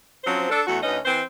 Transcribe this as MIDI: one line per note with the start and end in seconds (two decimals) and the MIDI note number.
0.24 0.48 53
0.24 0.48 54
0.24 0.48 60
0.24 0.48 61
0.24 0.48 72
0.49 0.60 62
0.49 0.60 69
0.66 0.77 40
0.66 0.77 57
0.66 0.77 66
0.82 0.98 38
0.82 0.98 61
0.82 0.98 63
0.82 0.98 71
0.82 0.98 75
1.05 1.21 52
1.05 1.21 60
1.05 1.21 72